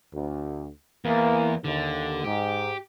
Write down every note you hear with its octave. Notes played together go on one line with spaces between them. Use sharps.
D2
E2 E3 A#3
D#2 D3
G#2 G4